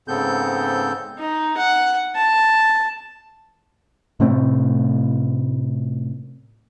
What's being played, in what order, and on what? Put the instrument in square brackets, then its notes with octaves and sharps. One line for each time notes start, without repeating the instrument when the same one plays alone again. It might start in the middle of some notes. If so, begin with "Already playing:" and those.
[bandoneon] G#2 C#3 B3 C4 A4 G6
[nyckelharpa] D#4
F#5
A5
[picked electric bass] A2 C3 A3 C4